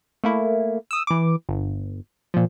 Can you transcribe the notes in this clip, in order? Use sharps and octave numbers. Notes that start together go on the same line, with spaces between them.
A3 A#3 E4
D#6 E6
E3 D6
G1
A#2 F3